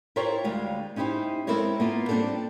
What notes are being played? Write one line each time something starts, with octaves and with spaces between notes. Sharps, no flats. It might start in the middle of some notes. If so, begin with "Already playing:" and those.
E4 F4 G4 A#4 C5 C#5
D2 G3 G#3 F5
C#4 D#4 E4 G4 C5
G#3 C4 E4 A4 A#4 C#5
A#3 B3 F4
G3 C4 D4 F#4 A4